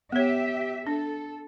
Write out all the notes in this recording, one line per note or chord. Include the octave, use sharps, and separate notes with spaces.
B3 G4 C#5 E5
D4 A4